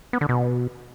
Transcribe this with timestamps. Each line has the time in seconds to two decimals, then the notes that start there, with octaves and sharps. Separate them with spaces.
0.13 B3
0.21 D3
0.29 B2